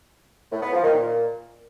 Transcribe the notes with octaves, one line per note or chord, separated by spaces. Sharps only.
A2
B3
F3
D#3
A#2